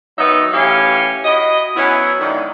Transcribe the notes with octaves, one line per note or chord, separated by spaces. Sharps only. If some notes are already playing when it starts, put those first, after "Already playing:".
D#3 F#3 B3 D#4 E5
A2 E3 C#4 G4 F5
E4 F#4 D#5
F#3 B3 C#4 E4
G#2 D3 D#3